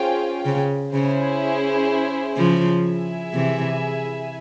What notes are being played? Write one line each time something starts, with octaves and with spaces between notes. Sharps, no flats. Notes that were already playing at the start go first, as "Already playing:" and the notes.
Already playing: C#4 F4 G#4 C5 G5
C#3
C#3 C#4 E4 G#4 C5
C#3 F3
E4 G#4 E5 G#5
C3 E3